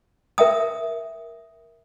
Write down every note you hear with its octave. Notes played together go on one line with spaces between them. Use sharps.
A#4 E5 G5 D#6